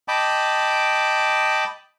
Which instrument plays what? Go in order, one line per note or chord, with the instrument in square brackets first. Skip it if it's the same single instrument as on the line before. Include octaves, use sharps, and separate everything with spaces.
[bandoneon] D#5 G5 A5 B5 D6